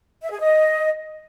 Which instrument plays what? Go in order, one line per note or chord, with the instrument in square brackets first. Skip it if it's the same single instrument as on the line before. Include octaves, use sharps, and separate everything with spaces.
[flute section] E5
G#4
D#5